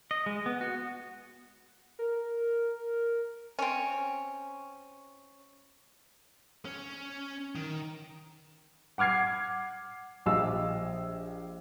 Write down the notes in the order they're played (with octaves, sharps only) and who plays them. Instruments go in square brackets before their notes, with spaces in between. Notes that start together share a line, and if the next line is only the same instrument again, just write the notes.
[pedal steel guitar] D#5
G#3
B3
F#4
[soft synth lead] A#4
[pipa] C4 C#4
[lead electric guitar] C#4
D#3
[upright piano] F#5 D6 F6 G#6 C7
A#1 G4 D#5 F5 E6